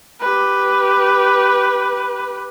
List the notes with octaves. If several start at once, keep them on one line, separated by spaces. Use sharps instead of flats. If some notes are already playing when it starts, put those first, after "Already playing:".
G4 B4